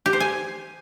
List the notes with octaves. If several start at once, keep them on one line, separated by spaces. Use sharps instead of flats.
G4
C5
G#5